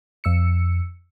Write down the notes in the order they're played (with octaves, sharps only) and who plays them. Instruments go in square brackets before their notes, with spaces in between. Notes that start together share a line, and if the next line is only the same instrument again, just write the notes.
[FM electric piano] F2 E6 C#7